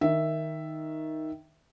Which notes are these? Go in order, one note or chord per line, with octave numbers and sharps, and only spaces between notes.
D#3 E5